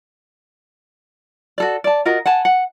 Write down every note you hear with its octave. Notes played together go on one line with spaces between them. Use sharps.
F#4 A4 D5
D5 A5
F4 F#4 A#4 D#5
F#5 G#5 A5
F#5